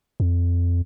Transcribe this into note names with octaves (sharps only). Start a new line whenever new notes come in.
F2